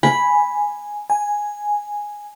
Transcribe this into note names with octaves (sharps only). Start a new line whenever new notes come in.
G#5 B5
G#5